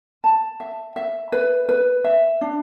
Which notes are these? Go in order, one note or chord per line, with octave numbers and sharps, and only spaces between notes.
A5
E5
E5
B4
B4
E5
D4